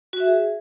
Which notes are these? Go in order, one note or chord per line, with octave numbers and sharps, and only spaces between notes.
F#4
E5
G#4